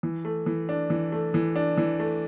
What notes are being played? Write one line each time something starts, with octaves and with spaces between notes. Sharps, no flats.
E3
A3
E3
D4
E3
A3
E3
D4
E3
A3